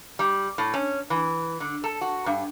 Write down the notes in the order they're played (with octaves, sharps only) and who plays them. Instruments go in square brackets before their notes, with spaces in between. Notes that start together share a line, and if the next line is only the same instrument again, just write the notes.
[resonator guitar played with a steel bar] G3
A2
C#4
E3
D3
A4
F#4
G2